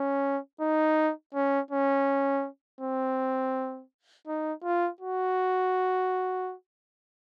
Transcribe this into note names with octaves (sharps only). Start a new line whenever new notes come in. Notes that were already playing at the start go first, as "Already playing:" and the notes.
Already playing: C#4
D#4
C#4
C#4
C4
D#4
F4
F#4